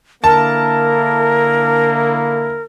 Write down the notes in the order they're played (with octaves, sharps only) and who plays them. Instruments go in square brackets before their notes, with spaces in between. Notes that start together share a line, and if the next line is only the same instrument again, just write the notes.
[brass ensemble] D3 A#3 E4 [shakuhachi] A#4 [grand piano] A5